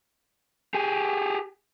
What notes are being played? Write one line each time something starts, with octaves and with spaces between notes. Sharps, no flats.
G4 G#4